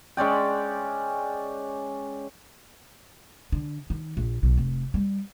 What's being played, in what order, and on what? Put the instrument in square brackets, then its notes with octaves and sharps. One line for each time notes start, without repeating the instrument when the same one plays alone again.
[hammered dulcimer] G#3 C#4 D5 G5
[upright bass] D3
D#3
A#1
B1
F1
G3